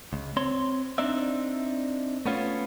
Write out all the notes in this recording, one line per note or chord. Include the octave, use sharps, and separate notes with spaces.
C#2
C4 C#5 C6
C4 D4 D#4 D5 E5
A3 B3 C#4 F4